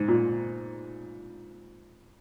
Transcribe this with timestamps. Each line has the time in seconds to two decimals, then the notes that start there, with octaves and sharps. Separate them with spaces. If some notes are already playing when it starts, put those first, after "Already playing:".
Already playing: G#2
0.08 A#2